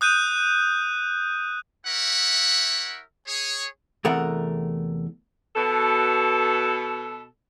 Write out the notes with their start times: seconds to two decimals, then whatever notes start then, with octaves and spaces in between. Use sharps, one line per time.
0.01 D#6 F#6 G6 D#7
1.86 E4 G4 A#4 C#5 E5 F#5
3.27 G#4 C#5
4.05 E2 C3 A3 A#4 F#5
5.56 B2 A4